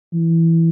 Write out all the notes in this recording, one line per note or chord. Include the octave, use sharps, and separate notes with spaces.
E3